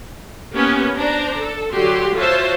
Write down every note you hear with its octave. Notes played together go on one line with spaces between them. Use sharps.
A#3 B3 C#4 G4
D4 C5 A#5
A4
D3 F#3 F#4 G4 C6
F4 F#4 C5 C#5 E5 A5